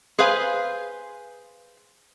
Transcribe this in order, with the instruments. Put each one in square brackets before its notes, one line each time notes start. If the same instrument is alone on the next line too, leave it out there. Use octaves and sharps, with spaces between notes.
[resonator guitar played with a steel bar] G#4 B4 C5 F5 G#5